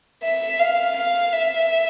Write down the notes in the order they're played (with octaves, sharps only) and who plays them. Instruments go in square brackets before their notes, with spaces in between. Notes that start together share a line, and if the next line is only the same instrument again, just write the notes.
[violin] E5
F5
F5
E5